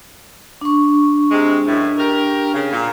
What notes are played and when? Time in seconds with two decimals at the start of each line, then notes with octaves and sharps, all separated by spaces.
0.61 D4 C#6
1.31 C3 G#3
1.67 F#2 A2
1.98 G4 A#4
2.54 C#3
2.72 A#2